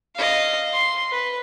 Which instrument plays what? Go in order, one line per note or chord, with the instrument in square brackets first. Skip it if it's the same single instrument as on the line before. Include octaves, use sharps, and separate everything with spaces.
[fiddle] D#5 F5
C6
B4